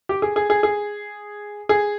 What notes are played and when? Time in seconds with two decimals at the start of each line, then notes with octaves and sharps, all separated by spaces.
0.09 G4
0.22 G#4
0.36 G#4
0.50 G#4
0.63 G#4
1.69 G#4